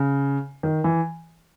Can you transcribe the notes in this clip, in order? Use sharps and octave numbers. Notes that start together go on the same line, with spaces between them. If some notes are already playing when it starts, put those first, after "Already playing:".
Already playing: C#3
D#3
E3